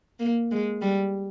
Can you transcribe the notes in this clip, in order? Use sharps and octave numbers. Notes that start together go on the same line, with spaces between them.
A#3
G#3
G3